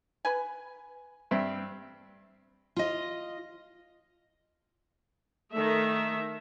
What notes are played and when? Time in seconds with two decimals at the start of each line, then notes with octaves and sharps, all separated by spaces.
0.25 B4 G#5
1.31 G2 C4 E5
2.76 F4 D#5
5.52 D#3 A3 E5